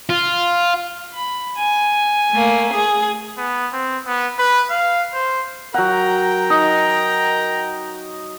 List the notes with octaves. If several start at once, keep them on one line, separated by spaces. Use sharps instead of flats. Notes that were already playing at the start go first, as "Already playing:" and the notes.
F4
B5
G#5
A3 A#3
G#4
B3
C4
B3
B4
F5
C5
F#3 A#4 F#5 G5 A#5
D#4